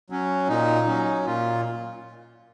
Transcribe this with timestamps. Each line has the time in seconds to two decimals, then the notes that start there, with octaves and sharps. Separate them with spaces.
0.10 F#3 C#4
0.48 A#2 D#4
0.87 F#3 C#4
1.26 A#2 F4